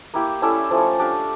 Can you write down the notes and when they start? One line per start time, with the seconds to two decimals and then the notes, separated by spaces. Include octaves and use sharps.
0.14 A#3 E4 G4
0.42 C#4 E4 A4 D5
0.71 F3 A3 C#4
0.99 D4 G4 D5 F5